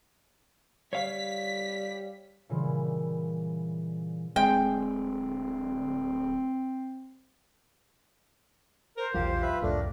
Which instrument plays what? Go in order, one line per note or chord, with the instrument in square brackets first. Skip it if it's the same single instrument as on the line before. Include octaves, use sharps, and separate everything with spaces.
[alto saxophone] G3 [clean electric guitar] C#5 F5 [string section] B6
[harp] A#2 C#3 E3 G3
[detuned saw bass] D1 [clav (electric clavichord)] G#3 [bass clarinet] C4 [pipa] G5
[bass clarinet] A#4 [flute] C5
[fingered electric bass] A#1 E2 F#3 [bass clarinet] F4 [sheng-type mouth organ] G4
[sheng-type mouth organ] B4 E5
[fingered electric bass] C2 F2 A2 [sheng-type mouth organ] A3 D4 [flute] A#4